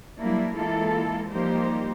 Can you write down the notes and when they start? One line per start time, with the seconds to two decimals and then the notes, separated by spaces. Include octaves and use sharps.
0.19 F#3 G3 A#3 D4 E4
0.56 E3 G#3 A#3 E4 F4 A4
1.30 F3 G3 A#3 D#4 G4 C5